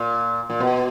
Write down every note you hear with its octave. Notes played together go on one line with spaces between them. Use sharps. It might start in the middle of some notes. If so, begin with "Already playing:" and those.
Already playing: A#2
A#2
B2